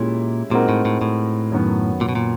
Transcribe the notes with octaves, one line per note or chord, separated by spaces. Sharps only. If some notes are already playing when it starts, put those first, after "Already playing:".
Already playing: A#2 G#3 C#4 E4 G4
A#2 G#3 C4 D#4 F#4 A#4
A2
A2
A2
F#2 D#3 F#3 B3
A#2
B2
A#2